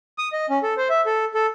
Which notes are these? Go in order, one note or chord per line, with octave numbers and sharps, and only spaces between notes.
D#6
D#5
C#4
A4
C5
E5
A4
A4